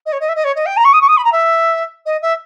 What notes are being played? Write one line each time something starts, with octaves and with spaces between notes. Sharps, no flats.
D#5
C#5
D#5
E5
D#5
C#5
D#5
G5
A#5
C#6
D#6
C#6
D#6
B5
A#5
E5
D#5
E5